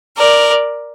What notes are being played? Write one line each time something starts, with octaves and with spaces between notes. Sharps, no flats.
A#4 D5